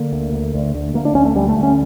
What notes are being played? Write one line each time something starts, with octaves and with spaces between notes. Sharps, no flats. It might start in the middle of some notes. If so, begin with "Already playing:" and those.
Already playing: D3 A#3
D2
D2
D2
D2
D2 A#3
D4
D2 C#4
A3
D2 G3
A3
D2
C#4